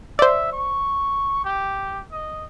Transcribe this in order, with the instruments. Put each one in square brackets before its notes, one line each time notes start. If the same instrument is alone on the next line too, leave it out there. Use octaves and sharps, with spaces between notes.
[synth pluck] C5 D5 [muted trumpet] E5
[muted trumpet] C#6
G4
D#5